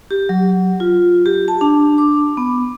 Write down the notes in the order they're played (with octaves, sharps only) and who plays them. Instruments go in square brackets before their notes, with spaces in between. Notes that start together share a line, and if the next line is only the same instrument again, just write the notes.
[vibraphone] G4
F#3
F4
G4
A5
D4
D6
B3